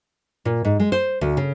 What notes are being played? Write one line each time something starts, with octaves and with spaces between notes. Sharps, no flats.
A#2
G#2
G#3
C5
D2
C#3